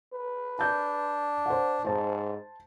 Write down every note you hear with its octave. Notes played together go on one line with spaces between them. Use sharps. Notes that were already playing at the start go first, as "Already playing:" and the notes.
B4
D4 A5 G6
C5 F#5
G#2 C5 A5